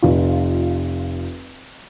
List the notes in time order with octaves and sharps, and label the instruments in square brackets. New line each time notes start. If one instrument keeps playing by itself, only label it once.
[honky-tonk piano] F1 F4